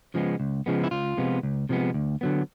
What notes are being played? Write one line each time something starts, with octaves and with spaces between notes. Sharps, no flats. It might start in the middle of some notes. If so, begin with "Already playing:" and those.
C#3 F3 G#3 B3
C#2
C#3 F3 G#3 B3
E4
C#2 F4
C3 F3 G#3 B3
C#2
C3 F3 G#3 B3
D2
D3 F#3 B3